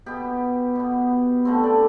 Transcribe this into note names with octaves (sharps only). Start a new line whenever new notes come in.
B2 B3 G4
B2 B3
D3 A3 C4
D5